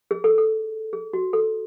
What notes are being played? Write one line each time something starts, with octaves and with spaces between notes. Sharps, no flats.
G#4
A4
A4
G#4
F#4
A4